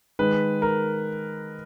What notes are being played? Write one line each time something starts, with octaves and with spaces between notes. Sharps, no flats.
D#3 G#3 B4
A#4